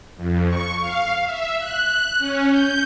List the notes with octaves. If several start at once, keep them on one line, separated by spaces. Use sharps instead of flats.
F2
C#6
F5
E5
F#6
C#4
G6